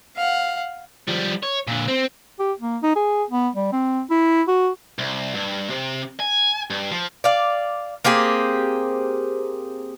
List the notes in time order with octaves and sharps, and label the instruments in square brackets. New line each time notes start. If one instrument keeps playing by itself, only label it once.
[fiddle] F5 F#5
[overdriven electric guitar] F3 G3
C#5
A#2 D3
C4
[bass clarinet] G4
A#3
D#4
G#4
B3
G3
C4
E4
F#4
[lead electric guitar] C2
G2
C3
G#5
G2
F3
[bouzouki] D5 F5
A#3 C4 G4 G#4